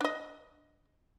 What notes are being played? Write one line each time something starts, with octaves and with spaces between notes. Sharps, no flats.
D4 D#5